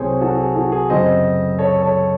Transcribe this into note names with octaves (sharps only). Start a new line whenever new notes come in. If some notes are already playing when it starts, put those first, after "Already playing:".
Already playing: C2 C3 F#3 C4 G#4 A4 C5 C#5
F#4 A4
G#4
F#4 A4
G#4
F#2 C#3 F#3 A3 C4 C5 D#5
A4 C#5
A4 C#5